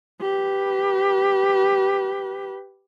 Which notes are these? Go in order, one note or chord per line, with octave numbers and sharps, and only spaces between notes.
G4 B4